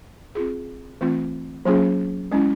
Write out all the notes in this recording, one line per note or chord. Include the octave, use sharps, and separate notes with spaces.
C4 F4 G#4
E3 A3 C4 F4
F#3 A#3 C#4 F4 G#4
G#3 C#4 E4